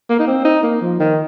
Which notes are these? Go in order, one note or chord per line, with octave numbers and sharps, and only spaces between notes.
A#3
D#4
C4
D#4
A#3
F3
D#3